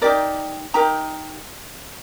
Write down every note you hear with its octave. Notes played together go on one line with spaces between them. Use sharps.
D#4 G4 A#4 D5
D#4 G4 A#4 A#5